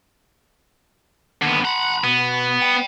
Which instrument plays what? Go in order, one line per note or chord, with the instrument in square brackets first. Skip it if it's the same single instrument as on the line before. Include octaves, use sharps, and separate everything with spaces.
[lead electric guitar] D#2 [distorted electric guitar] D3 B3
[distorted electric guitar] F#5 [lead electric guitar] A#5 B5
[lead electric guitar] B2 [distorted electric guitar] B3
[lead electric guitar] D5 G5